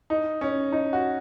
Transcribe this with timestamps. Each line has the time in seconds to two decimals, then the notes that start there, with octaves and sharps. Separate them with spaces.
0.10 D#4
0.41 C#4
0.72 D#4
0.93 F#4